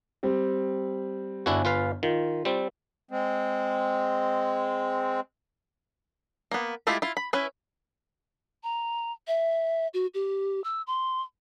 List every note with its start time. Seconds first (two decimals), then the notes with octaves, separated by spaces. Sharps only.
0.23 G3 C4
1.46 G1 D4 E4 F#4 G#5
1.65 F4 B4 F5
2.03 D#3 F4
2.45 G3 C4
3.11 G#3 C4
6.51 A#3 B3
6.87 G#3 A3 E4 F4 G4
7.02 E4 F4
7.17 B5
7.33 C#4 E4 B4
8.63 A#5
9.28 E5
9.94 F#4
10.14 G4
10.64 E6
10.87 C6